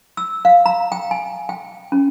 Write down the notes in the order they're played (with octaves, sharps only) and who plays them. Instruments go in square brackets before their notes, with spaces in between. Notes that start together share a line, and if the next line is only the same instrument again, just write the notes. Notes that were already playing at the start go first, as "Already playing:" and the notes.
[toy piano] E6
F5
A#5
G5
G#5
G5
C#4